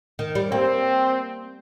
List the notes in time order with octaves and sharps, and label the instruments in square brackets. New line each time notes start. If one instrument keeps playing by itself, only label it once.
[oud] D#3
G3
[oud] A#3 [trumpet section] C4